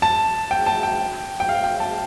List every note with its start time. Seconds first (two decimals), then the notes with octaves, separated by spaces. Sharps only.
0.02 A5
0.51 G5
0.66 A5
0.83 G5
1.40 G5
1.49 F5
1.64 G5
1.80 A5